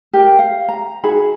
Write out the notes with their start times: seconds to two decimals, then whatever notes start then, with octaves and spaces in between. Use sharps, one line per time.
0.13 G4 A#4
0.39 F5
0.69 A#5
1.04 D#4 F#4 G#4 B5